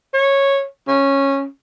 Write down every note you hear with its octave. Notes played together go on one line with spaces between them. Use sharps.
C#5
C#4